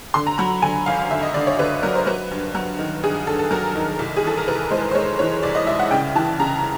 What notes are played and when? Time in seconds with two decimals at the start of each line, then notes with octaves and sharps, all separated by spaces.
0.14 D3 C6
0.27 A#5
0.38 F#3 B5
0.62 D3 G#5
0.86 G#1 F5
1.11 D3 E5
1.23 D#5
1.34 D3 D5
1.47 C#5
1.59 D3 B4
1.83 F#3 A#4
1.95 C5
2.07 F#3 B4
2.31 G2
2.55 F#3
2.79 D#3
3.03 G2 G#4
3.27 G2 A4
3.39 A4
3.51 F#3 A#4
3.75 D#3
3.99 C2
4.17 G#4
4.23 E3 A4
4.37 A#4
4.48 C2 B4
4.71 G#3 C5
4.91 C5
4.95 G#3 C#5
5.19 E3 C#5
5.43 C2 D5
5.55 D#5
5.67 C2 E5
5.79 F#5
5.91 C#3 G5
6.15 E3 A5
6.39 C#3 A#5